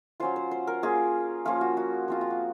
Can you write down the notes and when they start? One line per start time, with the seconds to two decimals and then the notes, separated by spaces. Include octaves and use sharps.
0.20 F#3 C#4 F4 C5
0.36 C5
0.51 C5
0.67 A#4
0.83 A#3 C#4 F4 G#4
1.45 F3 A#3 C#4 F4
1.61 F#4
1.77 F#4
2.08 F3 C4 F4
2.21 F4
2.30 F#4